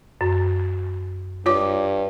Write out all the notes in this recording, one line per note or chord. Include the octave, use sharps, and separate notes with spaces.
F#2
G2 F4 C#5 D6